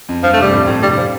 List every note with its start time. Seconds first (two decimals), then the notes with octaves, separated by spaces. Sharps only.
0.09 F2
0.23 G2 F3
0.33 A3
0.38 G2 C3 G3
0.52 F2 A2
0.67 F2 A2
0.83 G2 C3 G3
0.97 F3